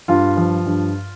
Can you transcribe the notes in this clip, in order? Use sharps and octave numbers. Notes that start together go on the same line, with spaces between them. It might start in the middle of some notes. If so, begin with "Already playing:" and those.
G2 F4
F3
G2